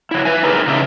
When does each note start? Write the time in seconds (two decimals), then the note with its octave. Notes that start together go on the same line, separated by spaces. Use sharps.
0.11 F#3 E4
0.25 B4 E5 G#5
0.43 D#4 E4 G4 G#4 A#4
0.67 C#3 D#4 G4 B4 E5